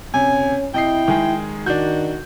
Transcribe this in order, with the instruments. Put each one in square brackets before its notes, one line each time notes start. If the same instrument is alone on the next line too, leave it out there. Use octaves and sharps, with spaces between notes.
[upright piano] C3 [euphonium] C#4 [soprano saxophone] G#5
[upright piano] C3 D#5 C7 [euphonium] E4 [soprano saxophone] G5
[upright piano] D#3 G#3 G#4
[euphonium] D#3 [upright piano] D4 G6 [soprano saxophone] F#4